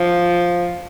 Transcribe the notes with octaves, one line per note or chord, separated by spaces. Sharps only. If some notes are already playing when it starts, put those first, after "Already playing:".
Already playing: F3